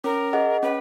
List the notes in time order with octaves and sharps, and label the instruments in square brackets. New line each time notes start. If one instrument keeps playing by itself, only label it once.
[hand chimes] C#4 [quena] A#4
[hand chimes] G#4 D#5 F#5
[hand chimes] C#4 [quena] B4